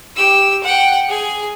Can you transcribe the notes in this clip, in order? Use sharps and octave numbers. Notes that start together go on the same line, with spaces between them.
G4 E6
F#5 G5
G#4 G#5